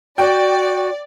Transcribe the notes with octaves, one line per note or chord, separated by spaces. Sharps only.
F#4 D5 G5